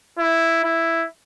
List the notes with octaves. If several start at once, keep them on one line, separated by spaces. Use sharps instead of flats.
E4
E4